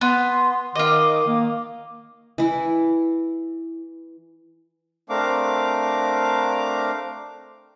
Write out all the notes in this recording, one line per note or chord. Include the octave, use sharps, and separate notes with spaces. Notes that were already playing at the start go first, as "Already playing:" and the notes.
B3 C6
D#3 F4 D#5 D6
A#3
E3 E4
A3 C4 D4 A#4 F5 D6